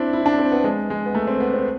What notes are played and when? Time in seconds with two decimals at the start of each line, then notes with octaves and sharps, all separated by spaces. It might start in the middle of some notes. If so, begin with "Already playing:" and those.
Already playing: C4 D4 E4
0.13 E4
0.26 D4
0.38 C4
0.52 B3
0.64 G#3
0.90 G#3
1.06 B3
1.15 A3
1.27 C4
1.40 B3
1.54 C4